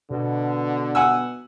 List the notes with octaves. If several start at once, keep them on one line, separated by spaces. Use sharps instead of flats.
B2 D3
F#5 G#5 E6